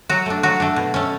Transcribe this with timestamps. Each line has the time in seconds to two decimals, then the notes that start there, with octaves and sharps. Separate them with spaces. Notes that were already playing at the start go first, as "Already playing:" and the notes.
0.09 F#3 F#4
0.26 A3 D4
0.43 F#3 F#4
0.60 A3 D4
0.76 B2
0.94 A3 C#4